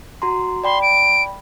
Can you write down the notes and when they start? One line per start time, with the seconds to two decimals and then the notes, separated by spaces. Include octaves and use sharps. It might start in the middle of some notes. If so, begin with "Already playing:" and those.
0.22 F#4 A#5 C6
0.64 D5 G5 B5 C6
0.82 D7